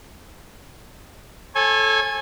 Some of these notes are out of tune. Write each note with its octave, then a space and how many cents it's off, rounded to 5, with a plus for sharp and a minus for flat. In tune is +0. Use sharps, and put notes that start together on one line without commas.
A4 -10 C#5 -35 G#5 +0